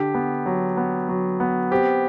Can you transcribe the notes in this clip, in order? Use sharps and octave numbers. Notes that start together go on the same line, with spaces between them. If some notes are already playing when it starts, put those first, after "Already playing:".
Already playing: D3 G4
B3
F#3
B3
F#3
B3
C4 G4